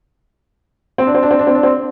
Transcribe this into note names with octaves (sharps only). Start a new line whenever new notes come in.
C4
D4
C4
D4
C4
D4
C4
D4
C4